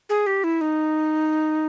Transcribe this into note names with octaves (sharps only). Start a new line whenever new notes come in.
G#4
G4
E4
D#4